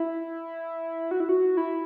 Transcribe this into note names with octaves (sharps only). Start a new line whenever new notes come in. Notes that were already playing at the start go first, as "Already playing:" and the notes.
Already playing: E4
F#4
E4
F#4
E4